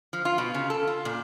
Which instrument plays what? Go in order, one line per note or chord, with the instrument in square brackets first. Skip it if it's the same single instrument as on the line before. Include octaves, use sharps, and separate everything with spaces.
[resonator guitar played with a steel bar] F3
F4
B2
C#3
A4
F4
A#2